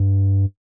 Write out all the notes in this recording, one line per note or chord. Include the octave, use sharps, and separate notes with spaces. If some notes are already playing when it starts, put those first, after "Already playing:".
Already playing: G2